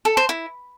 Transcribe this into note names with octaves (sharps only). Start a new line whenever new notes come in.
A4
C5
E4